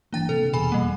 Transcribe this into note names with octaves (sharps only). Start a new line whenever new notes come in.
G1 E3 A#3 D4 G5 A6
C3 A4
F1 E2 B2 G#4 G#5 B5
G3 A#3